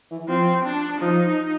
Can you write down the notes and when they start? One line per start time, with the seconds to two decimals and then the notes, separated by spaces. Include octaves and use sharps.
0.11 E3
0.28 F3 C4
0.65 D4
1.01 F3 D#4